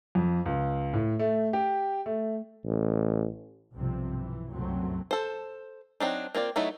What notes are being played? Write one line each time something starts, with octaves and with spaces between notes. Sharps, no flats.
F2
C#2
A2
A3
G4
A3
A1
B1 G2 C3 F3 C4
E3
C2 F#2 A#2 F#3 A3 C4
A4 C5
F#3 C4 D4 D#4
A#3 C4 F4 D5
F#3 A3 D#4 E4